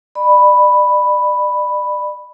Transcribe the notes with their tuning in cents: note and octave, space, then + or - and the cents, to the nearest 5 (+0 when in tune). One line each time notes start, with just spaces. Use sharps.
D5 +30 B5 +0